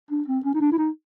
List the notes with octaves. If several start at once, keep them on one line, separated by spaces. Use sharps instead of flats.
D4
C4
C#4
D#4
D4
E4
D#4